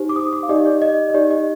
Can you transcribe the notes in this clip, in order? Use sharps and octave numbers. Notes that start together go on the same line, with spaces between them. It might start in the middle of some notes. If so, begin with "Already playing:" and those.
Already playing: D#4 G4 C5
D6
D#6
D6
F5
D#4 G4 D5 D#5
D5
D#5
D#5
D#4 G4 D5
D#5